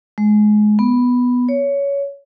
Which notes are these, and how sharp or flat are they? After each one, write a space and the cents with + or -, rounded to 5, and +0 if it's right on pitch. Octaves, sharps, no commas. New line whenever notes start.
G#3 +25
B3 +0
C#5 +15